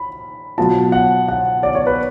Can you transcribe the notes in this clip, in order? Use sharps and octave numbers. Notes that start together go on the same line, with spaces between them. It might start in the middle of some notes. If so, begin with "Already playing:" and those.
Already playing: B5
B2 F#3 B3 F4 A5
F#5
F#5
D5
C#5
B4